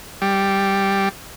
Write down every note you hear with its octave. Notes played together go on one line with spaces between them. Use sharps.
G3